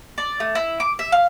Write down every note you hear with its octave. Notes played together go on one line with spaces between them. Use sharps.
D5
A3
E4
D6
E5
F5